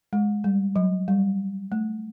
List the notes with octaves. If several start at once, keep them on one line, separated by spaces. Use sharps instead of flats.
G#3
G3
F#3
G3
A3